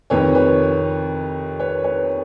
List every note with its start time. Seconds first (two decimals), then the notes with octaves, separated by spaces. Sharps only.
0.10 F2 C3 D#3 B4 C#5
0.35 B4 C#5
1.59 B4 C#5
1.84 B4 C#5